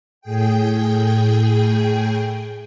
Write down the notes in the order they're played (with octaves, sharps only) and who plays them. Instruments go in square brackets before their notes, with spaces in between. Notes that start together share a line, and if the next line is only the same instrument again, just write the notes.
[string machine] A2 G#4 G5